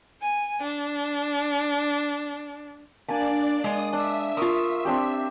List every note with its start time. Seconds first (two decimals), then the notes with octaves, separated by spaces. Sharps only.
0.21 G#5
0.63 D4
3.08 A#3 D4 D5 G#5 A5
3.64 G#3 D#6
3.93 D4 E5 E6
4.37 F4 A#4 C#6 D#6
4.85 C4 D4 G4